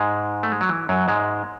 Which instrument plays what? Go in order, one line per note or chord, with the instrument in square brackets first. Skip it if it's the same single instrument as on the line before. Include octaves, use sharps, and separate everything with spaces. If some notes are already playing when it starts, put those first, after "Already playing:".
Already playing: [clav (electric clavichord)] G#2 G#3
A3
G#3
F#3
E3
F#2 F#3
G#2 G#3